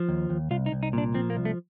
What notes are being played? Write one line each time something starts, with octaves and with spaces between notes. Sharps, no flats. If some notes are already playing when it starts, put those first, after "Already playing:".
Already playing: F3
D#2
D#2
C2 F4
D#4
C2
D#4
A#2 D4
F3 C4
A#3
C2
A3